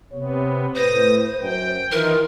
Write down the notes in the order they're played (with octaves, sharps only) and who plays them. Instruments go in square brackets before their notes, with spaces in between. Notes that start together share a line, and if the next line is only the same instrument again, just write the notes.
[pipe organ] C3 B3 [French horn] C#5
[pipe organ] A2 D#6 A#6 [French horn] B4 [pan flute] C5
[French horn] F#2 [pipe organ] G5
[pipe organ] D#3 D#4 F4 [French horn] E3 [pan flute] A#4